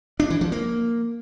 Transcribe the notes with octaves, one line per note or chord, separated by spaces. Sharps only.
D4
E3
F3
A#3